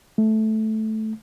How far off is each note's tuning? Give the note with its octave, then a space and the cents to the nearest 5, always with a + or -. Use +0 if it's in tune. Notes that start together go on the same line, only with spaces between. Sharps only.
A3 -10